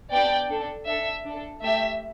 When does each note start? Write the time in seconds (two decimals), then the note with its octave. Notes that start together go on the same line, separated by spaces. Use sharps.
0.12 B3 D4 G4 D5 G5
0.50 D4 A4
0.87 D4 A4 E5
1.25 D4
1.30 A4
1.63 A3 G4 E5